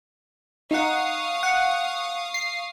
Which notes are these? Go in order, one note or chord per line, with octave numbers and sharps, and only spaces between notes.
D#4 F5 F#5 C#6 D#6
F#5
C7